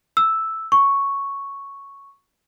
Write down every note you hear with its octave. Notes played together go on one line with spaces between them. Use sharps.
E6
C#6